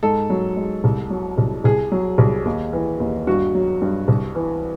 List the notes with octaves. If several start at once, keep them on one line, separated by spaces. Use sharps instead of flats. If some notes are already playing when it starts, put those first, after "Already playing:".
G#2 A4
F#3
G#2
C2
F#3
C2
C2 G#4
F#3
C2
D#2
E3
D#2
G2 F#4
F#3
G2
C2
E3